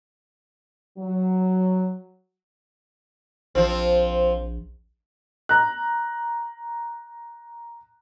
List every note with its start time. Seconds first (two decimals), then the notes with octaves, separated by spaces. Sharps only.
0.98 F#3
3.55 A#1 F3 C4
5.49 A#5 F#6